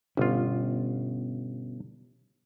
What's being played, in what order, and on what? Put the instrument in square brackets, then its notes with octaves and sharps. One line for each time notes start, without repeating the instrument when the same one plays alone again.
[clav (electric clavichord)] G1 F4 [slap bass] B2 C#4